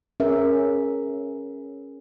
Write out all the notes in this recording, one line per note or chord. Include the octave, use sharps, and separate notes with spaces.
C#4 G#4 A#4 B4 E5